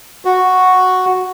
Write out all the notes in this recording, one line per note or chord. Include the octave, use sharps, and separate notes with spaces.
F#4